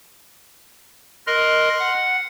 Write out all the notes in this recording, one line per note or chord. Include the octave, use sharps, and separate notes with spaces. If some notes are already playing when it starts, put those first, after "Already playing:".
A#4 D#5 C6 F6 F#6
F#5